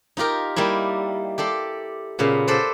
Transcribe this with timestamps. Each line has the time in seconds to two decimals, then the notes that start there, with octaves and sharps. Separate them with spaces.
0.17 D#4 F4 G4 A#4
0.56 G3 A#3 D#4 E4
1.38 G4 A4 D5 C6
2.19 A#2 C#3 B3 F5
2.48 A4 B4 C5 D5